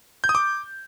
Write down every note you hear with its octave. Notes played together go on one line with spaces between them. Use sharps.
G6
D#6
D6